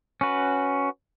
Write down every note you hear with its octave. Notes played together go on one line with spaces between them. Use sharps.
C#4 F#4 B4